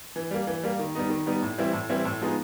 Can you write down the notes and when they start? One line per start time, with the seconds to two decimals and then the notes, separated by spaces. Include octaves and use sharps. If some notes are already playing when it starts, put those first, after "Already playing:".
0.16 E3
0.31 G3 A#3
0.47 E3
0.64 G3 A#3
0.79 D#3
0.95 G3 B3 D#4
1.10 D#3
1.26 G3 B3 D#4
1.42 A2
1.58 E3 G3 C4 E4
1.73 A2
1.89 E3 G3 C4 E4
2.05 A2
2.21 F3 G#3 B3 D#4